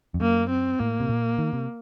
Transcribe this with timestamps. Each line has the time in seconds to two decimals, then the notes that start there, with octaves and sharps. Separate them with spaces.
0.14 F2
0.20 F#2 A#3
0.50 C4
0.80 A2 A#3
1.00 C3
1.09 A#2
1.38 D#3
1.53 C3